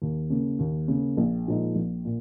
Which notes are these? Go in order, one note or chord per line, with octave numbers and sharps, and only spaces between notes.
D#2
C#3 A#3
D#2
C#3 A#3
A#1
A#2 F3 G#3 D#4
A#1
A#2